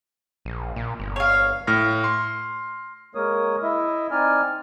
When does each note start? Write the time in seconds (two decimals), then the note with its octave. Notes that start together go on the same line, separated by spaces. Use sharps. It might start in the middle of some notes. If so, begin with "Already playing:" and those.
0.45 A#1
0.76 A#2
1.00 G1
1.16 C#5 F5
1.67 A2 F6 A#6
2.04 C6
3.15 G#3 A#3 A#4 C#5 D#6
3.63 E4 D#5 E5
4.11 C4 D#4 D5 G#5 F6